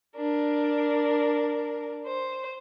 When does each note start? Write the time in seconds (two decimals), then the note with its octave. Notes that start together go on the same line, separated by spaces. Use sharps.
0.16 D4 A#4
2.06 C5